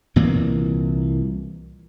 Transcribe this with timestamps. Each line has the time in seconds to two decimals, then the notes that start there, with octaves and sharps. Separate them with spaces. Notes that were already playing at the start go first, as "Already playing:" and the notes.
0.16 C2 A#2 E3 A#3